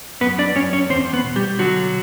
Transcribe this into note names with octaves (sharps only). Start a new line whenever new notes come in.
F#2 B3 B4
D4 D5
F#2 C#4 C#5
C#4 C#5
E2 C4 C5
B3 B4
B2
G3 G4
D3 F#3 F#4